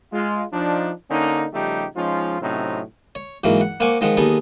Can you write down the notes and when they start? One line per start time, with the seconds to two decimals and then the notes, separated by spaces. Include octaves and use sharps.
0.12 G#3 F4
0.53 F3 D4 D#4
1.10 D3 A#3 C#4 D#4
1.53 C#3 F3 G3 A3 D#4 G4
1.96 F3 G#3 C#4 D#4 F4
2.41 A2 C3 F#3 C4 C#4 D#4
3.15 C#5
3.44 G#2 E3 F#3 A#3
3.61 F#5
3.80 A#3 C5 F#5 G#5 C#6 D6
4.01 D#3 F3 G#3 C5 F#5
4.17 D#2 B3 D#4 G#4 A4